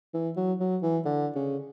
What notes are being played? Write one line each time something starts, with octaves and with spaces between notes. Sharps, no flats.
E3
F#3
F#3
E3
D3
C#3